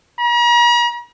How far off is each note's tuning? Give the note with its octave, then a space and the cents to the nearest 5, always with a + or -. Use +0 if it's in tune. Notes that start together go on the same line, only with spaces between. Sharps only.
A#5 +45